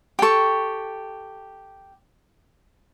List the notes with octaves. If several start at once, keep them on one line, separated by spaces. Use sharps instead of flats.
G4 A4 G5 C#6